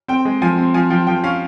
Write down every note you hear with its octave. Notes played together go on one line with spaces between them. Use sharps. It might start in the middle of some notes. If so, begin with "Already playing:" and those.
C4 G5
G#3
F3 G#5
C4
F3 G#5
F3 G5
F3 G5
C#4 F5